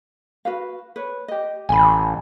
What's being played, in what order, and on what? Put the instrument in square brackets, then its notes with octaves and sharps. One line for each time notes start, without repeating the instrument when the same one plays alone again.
[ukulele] F#4 B4 F5
B4 C#5
G4 D#5
[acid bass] A1 [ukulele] G#5 B5